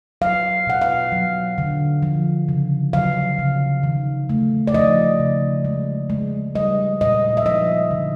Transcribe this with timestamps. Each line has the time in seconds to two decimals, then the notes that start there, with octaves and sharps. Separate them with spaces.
0.21 F#3 F5
0.67 B2 F#5
0.81 F5
1.12 F#3
1.58 D3
2.02 F3
2.49 C#3
2.93 F#3 F5
3.39 C#3
3.83 D#3
4.30 A3
4.67 D5
4.74 F3 D#5
5.20 C#3
5.65 G#3
6.10 G#3
6.55 G3 D#5
7.01 A#2 D#5
7.37 E5
7.45 F3 D#5
7.91 D3